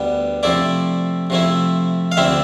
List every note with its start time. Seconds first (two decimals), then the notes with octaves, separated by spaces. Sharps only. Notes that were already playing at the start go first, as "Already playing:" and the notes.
Already playing: D2 D3 G3 B3
0.43 C3 F3 A3 E4 D5
1.30 C3 F3 A3 E4
2.12 F5
2.17 D2 D3 A3 C4 E4 E5